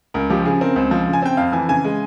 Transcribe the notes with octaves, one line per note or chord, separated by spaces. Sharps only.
C#2 A#4
F3 G4
C#3 G#4
C4 A#4
C#2 C5
F3
C#3
G#5
C4 G5
F2 F5
E3 G#5
C#3 G#5
G#3